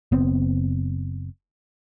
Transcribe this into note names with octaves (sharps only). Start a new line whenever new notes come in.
F#1 B3 C4